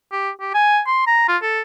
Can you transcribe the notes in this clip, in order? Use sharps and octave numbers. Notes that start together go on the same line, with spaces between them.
G4
G4
G#5
C6
A#5
F4
A4